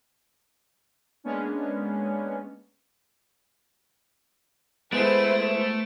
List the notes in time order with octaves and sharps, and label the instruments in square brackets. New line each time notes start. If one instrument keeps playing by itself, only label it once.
[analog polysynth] G#3 A#3 B3 C#4 D4
[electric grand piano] G#3 B3 F#5 [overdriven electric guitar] A3 [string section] E4 B4 C5 [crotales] D7